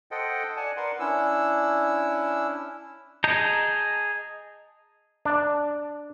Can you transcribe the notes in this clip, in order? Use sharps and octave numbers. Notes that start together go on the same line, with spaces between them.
A4 C5 D#5 F#5 G5
D5 F#5 G#5 A5
A#4 B4 D5 F#5 C6
C#4 D4 E4 E6
G#4 D#5 A5 A#5 G6
D4